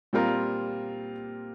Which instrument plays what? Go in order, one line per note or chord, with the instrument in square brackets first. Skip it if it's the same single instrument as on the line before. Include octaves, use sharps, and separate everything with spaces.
[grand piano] A#2 G3 C4 F4 A#4